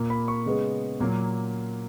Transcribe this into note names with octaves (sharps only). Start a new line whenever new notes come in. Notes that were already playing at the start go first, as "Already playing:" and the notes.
Already playing: A#2 A#3
B5
C#6
C#3 G#3 B3
A#2 F#3 A#3